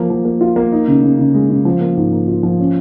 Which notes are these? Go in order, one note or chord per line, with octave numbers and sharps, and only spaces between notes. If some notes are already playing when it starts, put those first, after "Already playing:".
Already playing: F3 A#3
F3
A#3
F4
A#3
D#4
C#3
C#3
C#3
G#3
C#3
F3
A#3
G#2
A#3
F4
F3
C#4